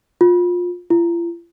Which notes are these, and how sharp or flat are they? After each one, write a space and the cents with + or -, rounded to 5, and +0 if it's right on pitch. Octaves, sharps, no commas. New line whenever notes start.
F4 +25
F4 -45